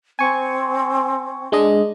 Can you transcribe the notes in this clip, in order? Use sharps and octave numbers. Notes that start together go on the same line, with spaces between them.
C4 G#5 C#6
G#3 D4 D#5